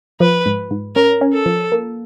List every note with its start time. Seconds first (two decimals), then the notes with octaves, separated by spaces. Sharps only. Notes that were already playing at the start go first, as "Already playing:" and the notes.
0.20 F3 B4
0.46 G#2
0.71 G#2
0.95 C#4 A#4
1.21 C#4
1.33 A4
1.46 F3
1.72 A#3